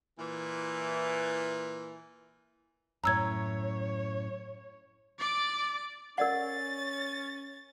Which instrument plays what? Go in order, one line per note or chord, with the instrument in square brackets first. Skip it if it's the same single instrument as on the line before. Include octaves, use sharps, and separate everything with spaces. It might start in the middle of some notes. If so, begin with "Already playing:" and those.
[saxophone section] A#2 E3
[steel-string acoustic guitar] F#2 A2 [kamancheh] C#5 [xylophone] A#5 E6 G#6
[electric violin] D5 D6
[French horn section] C#4 [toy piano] A#4 D5 F#5 [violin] A6